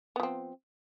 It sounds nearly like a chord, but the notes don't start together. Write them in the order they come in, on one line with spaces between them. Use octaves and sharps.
B3 F3 C4